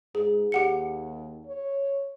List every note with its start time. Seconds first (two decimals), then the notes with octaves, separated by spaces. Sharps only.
0.15 G#2 G#4
0.52 D#2 G4 F#5 C#7
1.46 C#5